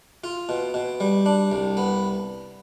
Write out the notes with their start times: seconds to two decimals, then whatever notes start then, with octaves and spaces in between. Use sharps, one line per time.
0.24 F4
0.49 B2
0.74 B2
1.00 G3
1.26 D4
1.52 C2
1.77 B3